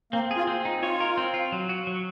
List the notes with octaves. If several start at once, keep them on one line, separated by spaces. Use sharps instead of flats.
A#3 C4
G#4
F4
C4
D#4
F4 C#5
A#4
C4
F4
F#3
F#4
F#3